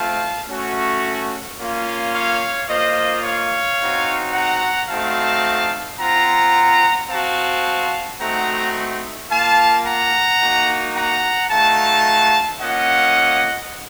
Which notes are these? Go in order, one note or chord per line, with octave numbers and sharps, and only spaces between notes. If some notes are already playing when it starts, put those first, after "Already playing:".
Already playing: A3 C4 F4 F5 A5
A3 C#4 F#4
A#3 C#4 F4
C#5 F5
A#3 F4 C5 D#5
C#5 F5
C4 D#4 F#4
F#5 A#5
A3 C4 D#4 F#4 F5 A5
C4 F4 F#5 A#5
C4 F#4 F5 A5
A3 C4 D#4 F#4 F#5 A#5
A#3 F4 F5 A5
F#5 A#5
A#3 D#4 F#4
F#5 A#5
A3 D#4 F#4 F5 A5
A#3 C#4 F4 D#5 F#5